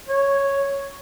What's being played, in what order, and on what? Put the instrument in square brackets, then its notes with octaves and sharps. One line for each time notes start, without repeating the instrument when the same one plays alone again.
[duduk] C#5